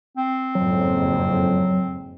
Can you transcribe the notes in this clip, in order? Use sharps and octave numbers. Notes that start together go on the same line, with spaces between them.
C4
F#1 F2 G#2 F#3